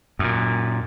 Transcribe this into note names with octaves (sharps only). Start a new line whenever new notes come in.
F#2 A#2